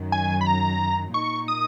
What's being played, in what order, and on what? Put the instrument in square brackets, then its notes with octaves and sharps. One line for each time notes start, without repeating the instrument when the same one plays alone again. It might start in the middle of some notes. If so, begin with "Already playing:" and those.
Already playing: [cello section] F#2 D#3 F#3
[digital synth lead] G#5
B5
A#5
[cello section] A#2 A#3 D#4 [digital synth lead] C#6
[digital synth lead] D#6